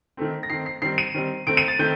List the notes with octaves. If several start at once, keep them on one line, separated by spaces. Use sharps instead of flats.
D#3 A3 C4
A#6
D#3 A3 C4 C7
C7
D#3 G3 C4 C7
D#7
D#3 G3 C4
D#3 A3 C4 D7
D#7
A6
D#3 A3 C4 G6